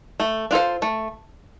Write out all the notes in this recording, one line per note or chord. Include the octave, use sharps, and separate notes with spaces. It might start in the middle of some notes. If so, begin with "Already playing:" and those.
A3
D4 F4 A4 C5
A3